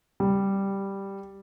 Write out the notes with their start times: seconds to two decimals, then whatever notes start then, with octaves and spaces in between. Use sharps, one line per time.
0.20 G3